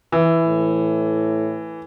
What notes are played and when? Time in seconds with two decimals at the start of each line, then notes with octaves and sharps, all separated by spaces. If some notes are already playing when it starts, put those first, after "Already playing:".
0.12 E3
0.47 A2